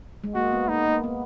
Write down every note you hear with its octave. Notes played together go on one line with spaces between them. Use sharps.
G#3
A#3 F#4
B3
A#3 D#4
A#3
B3